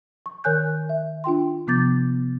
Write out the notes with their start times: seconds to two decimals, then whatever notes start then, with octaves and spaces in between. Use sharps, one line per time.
0.26 C#6
0.44 D#3 A#4 C#5 G#5 F#6 G6
0.89 E5
1.24 D4 F4 G5 C6
1.67 C3 F3 B3 D6 G6 A6